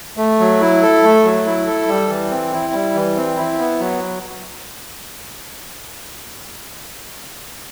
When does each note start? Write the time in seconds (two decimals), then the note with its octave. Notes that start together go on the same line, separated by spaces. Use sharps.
0.17 A3
0.40 F#3
0.61 E4
0.82 A4
1.03 A3
1.24 F#3
1.46 E4
1.67 A4
1.88 G3
2.09 E3
2.31 C4
2.53 E4
2.73 G3
2.95 E3
3.16 C4
3.37 E4
3.58 B3
3.80 F#3